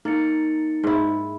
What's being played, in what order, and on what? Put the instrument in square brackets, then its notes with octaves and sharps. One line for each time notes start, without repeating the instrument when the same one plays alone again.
[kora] A#3 [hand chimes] D#4 A6 C#7
[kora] G#2 E4